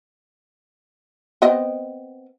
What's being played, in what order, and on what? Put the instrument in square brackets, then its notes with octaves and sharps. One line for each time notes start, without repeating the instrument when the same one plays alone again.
[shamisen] B3 C4 D#5